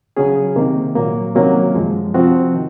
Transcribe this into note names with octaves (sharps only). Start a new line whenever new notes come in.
C#3 F#3 C#4 G#4
C3 D#3 A#3
A#2 F#3 A#3
C3 D#3 F#3 A#3 C#4
F#2 F3 G#3
C3 F3 C4 F#4
D#3